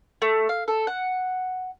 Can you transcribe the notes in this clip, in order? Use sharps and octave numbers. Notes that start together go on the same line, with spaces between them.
A3
F5
A4
F#5